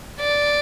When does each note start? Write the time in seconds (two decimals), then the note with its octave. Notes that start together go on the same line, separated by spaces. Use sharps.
0.20 D5